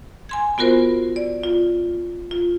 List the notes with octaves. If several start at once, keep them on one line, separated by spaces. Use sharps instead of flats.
G#5 C6 G#6
B3 F4 F#4 A#4 C5
D5
F4
F4